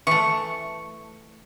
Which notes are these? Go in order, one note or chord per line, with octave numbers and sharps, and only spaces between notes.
E3 A3 C#6